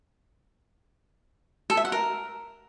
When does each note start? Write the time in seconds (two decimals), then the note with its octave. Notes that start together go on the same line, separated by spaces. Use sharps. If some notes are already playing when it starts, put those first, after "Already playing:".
1.70 A4
1.77 E5
1.85 F#5
1.92 A#4